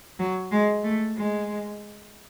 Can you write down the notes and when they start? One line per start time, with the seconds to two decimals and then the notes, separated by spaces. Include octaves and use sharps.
0.19 F#3
0.52 G#3
0.84 A3
1.16 G#3